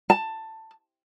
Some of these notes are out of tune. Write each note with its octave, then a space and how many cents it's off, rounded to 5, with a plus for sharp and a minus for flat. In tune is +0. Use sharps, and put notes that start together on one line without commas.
A5 +15